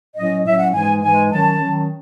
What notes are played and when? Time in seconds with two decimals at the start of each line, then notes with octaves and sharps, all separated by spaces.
0.16 A2 F#3 C#4 D#5
0.45 A2 F#3 C#4 E5
0.59 F#5
0.73 G#2 E3 G#3 G#5
1.02 G#2 E3 G#3 G#5
1.31 D#3 F#3 C#4 A5
1.60 D#3 F#3 C#4